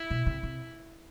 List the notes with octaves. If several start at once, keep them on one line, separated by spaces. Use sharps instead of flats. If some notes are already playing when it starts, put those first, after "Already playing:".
Already playing: E4
B2
C3
C3